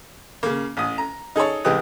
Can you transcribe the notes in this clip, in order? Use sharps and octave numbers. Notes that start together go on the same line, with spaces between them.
C#3 A#3
A1 D#6
A#5
D#4 G#4 A4 C#5
C2 E3 G#3 G4 D#5 F#6